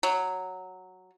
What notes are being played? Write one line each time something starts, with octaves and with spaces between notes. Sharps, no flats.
F#3